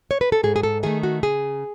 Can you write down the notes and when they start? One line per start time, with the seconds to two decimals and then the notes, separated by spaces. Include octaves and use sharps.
0.11 C#5
0.21 B4
0.32 A4
0.43 G#2 G#4
0.56 G#4
0.63 A4
0.83 D#3 A3 G#4
1.03 F#4
1.23 C#3 G#4